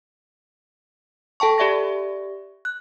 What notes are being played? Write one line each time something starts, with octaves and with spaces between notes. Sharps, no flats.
A4 G5 A5 C#6
G4 D5 E5 C#6 A#6
F#6